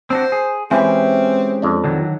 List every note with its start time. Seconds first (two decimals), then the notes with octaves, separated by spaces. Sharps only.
0.10 C4 D4 F#4 C5
0.32 G#4
0.71 E3 G#3 C4 C#4 G4
1.62 F2 D4
1.84 D3 D#3 F#3